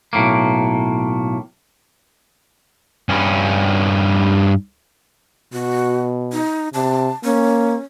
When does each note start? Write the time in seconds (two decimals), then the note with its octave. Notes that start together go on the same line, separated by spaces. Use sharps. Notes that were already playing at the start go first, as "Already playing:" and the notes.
0.13 B1 A2 A#3
3.09 G2 C#4
5.53 B2 F#4
6.33 D#4
6.74 C3 A5
7.24 A#3 C#4